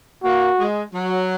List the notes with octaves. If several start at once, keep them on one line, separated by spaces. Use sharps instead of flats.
A#3 F#4
G#3
F#3